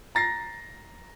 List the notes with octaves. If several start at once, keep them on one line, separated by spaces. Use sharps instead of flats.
A#5 A6 A#6 C7